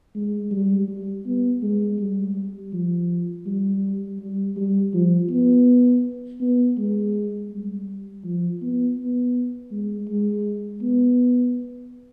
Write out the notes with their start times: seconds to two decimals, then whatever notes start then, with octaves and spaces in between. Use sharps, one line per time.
0.15 G#3
0.52 G3
0.88 G3
1.26 B3
1.62 G#3
2.00 G3
2.73 F3
3.46 G3
4.20 G3
4.57 G3
4.94 F3
5.31 B3
6.41 B3
6.78 G#3
7.51 G3
8.24 F3
8.62 B3
8.98 B3
9.72 G#3
10.09 G#3
10.82 B3